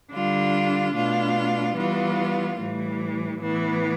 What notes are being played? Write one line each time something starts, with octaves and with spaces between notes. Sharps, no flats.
D3 G3 D4 F4
B2 A3 D4 F4
E3 G3 B3 F4
A2 E3 G3
A2 E3 B3